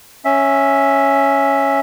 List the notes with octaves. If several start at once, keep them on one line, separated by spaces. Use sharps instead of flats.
C#4 E5